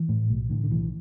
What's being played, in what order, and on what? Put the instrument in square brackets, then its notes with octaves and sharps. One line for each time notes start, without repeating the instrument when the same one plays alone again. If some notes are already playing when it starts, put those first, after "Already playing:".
Already playing: [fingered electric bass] E3
A2
B1
A2 D3
D3
B1 E3